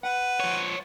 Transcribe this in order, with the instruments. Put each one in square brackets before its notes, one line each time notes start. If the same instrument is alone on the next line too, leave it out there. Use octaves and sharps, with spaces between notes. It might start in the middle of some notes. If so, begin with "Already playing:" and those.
[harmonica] B4 [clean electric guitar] F#5
[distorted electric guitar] F3 C#5